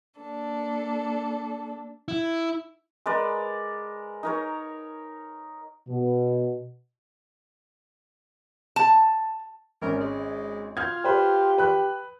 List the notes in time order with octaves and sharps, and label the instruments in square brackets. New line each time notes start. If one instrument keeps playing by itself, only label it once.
[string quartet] A#3 D4 A4
[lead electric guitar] E4
[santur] G#3 A#4 B4 D5
D#4 A#4 C#5
[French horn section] B2
[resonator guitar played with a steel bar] A5
[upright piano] G#1 C#4 [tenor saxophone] A#4
[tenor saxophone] G#3
[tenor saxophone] F4 [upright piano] F6 G6 G#6
[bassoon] G4 [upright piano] B4 C5
[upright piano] B4 F#6